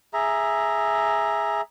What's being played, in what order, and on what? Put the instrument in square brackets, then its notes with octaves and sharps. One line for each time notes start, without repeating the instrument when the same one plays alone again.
[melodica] G#4 E5 A#5